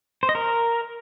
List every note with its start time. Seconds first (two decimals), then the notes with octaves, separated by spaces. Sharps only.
0.23 C5
0.29 D#5
0.35 A#4